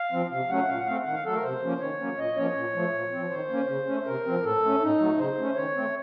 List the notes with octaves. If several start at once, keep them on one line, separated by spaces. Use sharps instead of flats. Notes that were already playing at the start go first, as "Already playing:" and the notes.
Already playing: F5
F3 C4
C3 F5
F#3 A3 C#4 F#5
A#2 F5
F#5
A3 C4 F5
D#3 F#5
F5
F#3 A3 A4
A#4
C3 C5
F3 A#3 C#4
D#3 C#5
F#3 A#3 C#4
A#2 D#5
F3 A#3 C#4 C#5
A#2
F3 A3
A#2
F3 C4
D#3 C5
A#3 C#4
C#3
A3 C#4
C3 A#4
F3 C4
A2 A4
A3 C#4
A2 D#4
F#3 A3
C#3 C5
A3 C#4
D#3 C#5
A3 C4